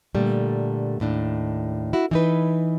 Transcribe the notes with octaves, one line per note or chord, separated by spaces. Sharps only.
A#2 D3 G3 A3
D#2 A2 D4
E4 F#4
E3 D#4 B4